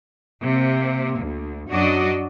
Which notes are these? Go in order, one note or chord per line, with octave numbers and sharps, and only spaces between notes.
C3 A#3
D2
F#2 F#3 D4 F#4 D5 D#5